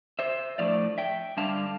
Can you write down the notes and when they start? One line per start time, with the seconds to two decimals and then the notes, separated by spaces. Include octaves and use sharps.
0.19 C5 E5
0.58 A2 F3 A3 D4 D5 F5
0.98 E5 G5
1.37 G2 D3 G3 D4 F5 A5